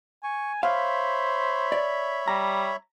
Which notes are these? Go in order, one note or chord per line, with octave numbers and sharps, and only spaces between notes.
G#5 C#6
C5 C#5 E5 F5 B5
D5
G3 A#5